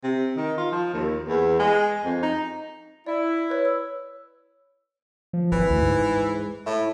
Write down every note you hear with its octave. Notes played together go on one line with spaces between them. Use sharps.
C3
D#3
F4
F3
D#2
E2
G#3
F2
D#4
E4 D5
B4 C#5
E6
F3
G#1 E3
D2
G#2
A2 E4